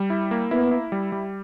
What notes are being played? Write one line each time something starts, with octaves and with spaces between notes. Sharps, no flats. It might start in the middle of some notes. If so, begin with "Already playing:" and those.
Already playing: G3
E4
A#3
B3 E4
E4
G3
G3